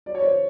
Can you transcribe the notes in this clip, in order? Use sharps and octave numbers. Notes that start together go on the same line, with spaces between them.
F#3 D5
C#5
F#3 C5 D5